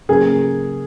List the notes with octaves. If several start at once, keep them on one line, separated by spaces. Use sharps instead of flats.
C#3 F#3 A#3 C#4 G#4 A#4